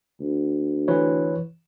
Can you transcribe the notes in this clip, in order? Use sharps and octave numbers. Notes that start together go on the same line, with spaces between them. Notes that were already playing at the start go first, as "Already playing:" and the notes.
D2
E3 B4 C#5